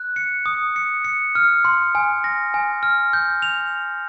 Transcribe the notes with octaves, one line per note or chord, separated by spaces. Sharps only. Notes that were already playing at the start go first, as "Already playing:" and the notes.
Already playing: F#6
C#7
D#6
C#7
C#7
F6
C6
G#5
A#6
G#5
F6
G6
F7